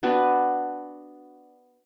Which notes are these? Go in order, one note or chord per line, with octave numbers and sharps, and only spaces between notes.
B3 D4 F#4 B4